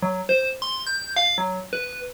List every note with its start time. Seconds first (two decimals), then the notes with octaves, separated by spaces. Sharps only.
0.03 F#3
0.29 C5
0.62 C6
0.87 G6
1.16 F5
1.38 F#3
1.73 B4